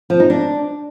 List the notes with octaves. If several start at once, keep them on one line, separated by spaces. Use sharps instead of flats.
F3
D#4
D4